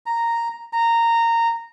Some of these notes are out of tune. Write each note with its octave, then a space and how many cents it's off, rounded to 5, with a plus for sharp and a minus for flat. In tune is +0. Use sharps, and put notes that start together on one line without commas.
A#5 -5
A#5 -15